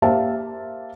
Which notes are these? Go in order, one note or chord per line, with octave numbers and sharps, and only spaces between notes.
A#3 G4 C5 E5 F5 A5